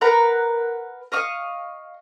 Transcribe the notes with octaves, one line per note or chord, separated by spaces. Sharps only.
A#4 B4 F#5 A#5
D#5 F5 C#6 D#6